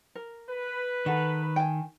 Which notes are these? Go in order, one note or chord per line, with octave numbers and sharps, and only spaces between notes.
A#4
B4
D#3 A4 F#5
G5 G#5